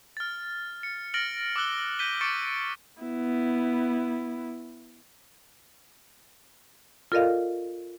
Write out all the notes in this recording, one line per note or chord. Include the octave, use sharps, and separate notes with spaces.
F6 A6
C#7
F6 A6 A#6 D7 F#7
D6 E6 F#6 G7
G6 B6 D#7 G7
C#6 D6 A6 C#7 D7
B3 E4
F4 A4 A#4 D5 D#5 F5